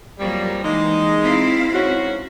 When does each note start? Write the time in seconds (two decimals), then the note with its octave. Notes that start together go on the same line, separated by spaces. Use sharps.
0.19 F2 F#3 G3 A#3
0.63 E3 G#3 A#3 D#4
1.22 C4 E4 F5
1.73 G#2 C#4 F#4